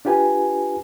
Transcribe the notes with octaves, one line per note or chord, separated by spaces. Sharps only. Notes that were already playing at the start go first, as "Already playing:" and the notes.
D4 F4 G4 B4 G#5